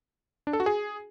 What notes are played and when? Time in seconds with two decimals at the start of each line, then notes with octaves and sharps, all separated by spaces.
0.47 D4
0.53 A4
0.60 F#4
0.66 G#4